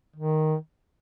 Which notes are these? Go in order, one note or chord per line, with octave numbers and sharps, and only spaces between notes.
D#3